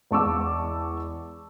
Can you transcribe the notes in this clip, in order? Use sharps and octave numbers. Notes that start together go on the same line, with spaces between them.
E2 G#3 A5 C#6 D6 E6